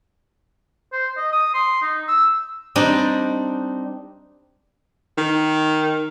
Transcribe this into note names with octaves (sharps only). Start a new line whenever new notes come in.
C5
D#5
D#6
C6
D#4
E6
G3 C4 D4 D#4
D#3